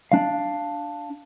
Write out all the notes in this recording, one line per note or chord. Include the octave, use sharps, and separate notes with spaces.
D4 F5